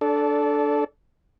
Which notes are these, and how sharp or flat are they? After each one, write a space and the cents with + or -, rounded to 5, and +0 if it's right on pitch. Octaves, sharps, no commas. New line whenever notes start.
D4 +0 A4 -10 D5 -25